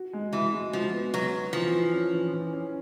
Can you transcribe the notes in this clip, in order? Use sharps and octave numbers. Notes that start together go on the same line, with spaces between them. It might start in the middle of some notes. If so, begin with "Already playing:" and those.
Already playing: F#4
G#3
E3 F#4
G#3
F3 F#4
B3
F#3 B3
B3
E3 F3
E3
C#4
E3
E3
C#4